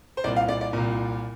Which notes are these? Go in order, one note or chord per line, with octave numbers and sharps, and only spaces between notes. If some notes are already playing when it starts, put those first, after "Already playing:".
C5
C2 A#2 D5
F5
D5
D5
C2 A#2